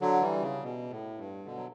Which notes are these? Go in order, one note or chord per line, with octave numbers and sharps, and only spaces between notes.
D3 F#3
E3 G3
C#3
B2
A2
G2
B2 D3
F#3